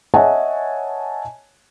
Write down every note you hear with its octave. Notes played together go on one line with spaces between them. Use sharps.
C#5 D#5 E5 F#5 G#5 A5